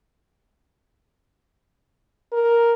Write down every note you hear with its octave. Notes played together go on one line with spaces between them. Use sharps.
A#4